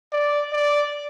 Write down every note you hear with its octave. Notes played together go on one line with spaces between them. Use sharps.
D5
D5